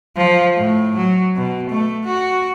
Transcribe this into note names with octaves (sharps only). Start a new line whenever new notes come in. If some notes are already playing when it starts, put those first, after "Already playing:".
F3
A2
F#3
B2
A3
F#4